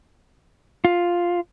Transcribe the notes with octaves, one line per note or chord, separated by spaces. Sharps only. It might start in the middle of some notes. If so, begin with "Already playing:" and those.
F4